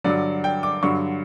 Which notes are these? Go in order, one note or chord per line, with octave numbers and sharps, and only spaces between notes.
G2 D3 F#3 D5
G5
D6
G2 D3 F#3 C#6